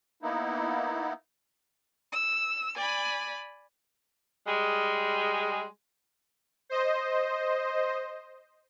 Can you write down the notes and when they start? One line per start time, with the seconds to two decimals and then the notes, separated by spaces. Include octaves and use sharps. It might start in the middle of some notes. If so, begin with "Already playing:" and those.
0.23 A#3 B3 D#4 E4
2.11 E6
2.76 D5 G#5 B5
4.47 G3 G#3
6.69 C5 D#5